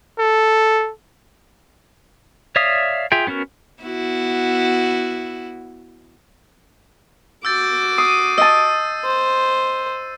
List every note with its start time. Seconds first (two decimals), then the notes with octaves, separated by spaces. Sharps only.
0.19 A4
2.56 C#5 D5 E5 F5 D#6
3.12 F4 G#4 E5 G5
3.27 B3 C#4 F#4 A#4
3.82 B3 E4 F#4
7.45 F#4 D6 E6 G6 A6
7.98 D#6 C7 D#7
8.38 D#5 A5 E6
9.05 C5